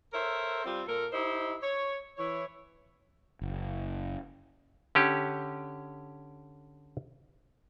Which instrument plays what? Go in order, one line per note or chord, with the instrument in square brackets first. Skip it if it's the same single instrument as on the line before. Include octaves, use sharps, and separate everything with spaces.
[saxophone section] A4 A#4 C5 C#5 E5
G3 C4 F4
A#2 A4 A#4
D#4 E4 G4 C5 D#5
C#5
E3 E4 C#5
[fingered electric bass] F#1
[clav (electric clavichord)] D3 C#4 G4